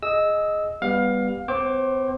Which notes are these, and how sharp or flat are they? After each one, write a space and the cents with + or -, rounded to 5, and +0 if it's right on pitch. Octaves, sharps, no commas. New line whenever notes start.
G#4 +0 D#5 +0 E6 -15
G3 +15 B3 +0 F5 +20
C4 -45 C5 +35 D6 +0